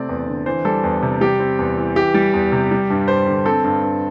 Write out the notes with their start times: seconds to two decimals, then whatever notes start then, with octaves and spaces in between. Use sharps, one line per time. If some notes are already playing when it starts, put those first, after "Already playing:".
Already playing: C3 A3 C4 D5
0.09 E2
0.28 D3
0.46 E3 C5
0.65 G3 A4
0.83 E2
1.02 C3
1.21 G3 G4
1.40 C4
1.59 E2
1.77 E3
1.96 E3 G4
2.14 G3
2.34 E2
2.52 C3
2.71 G3
2.90 G2
3.08 G2 C5
3.27 D3
3.46 C4 A4
3.64 G2
3.83 G2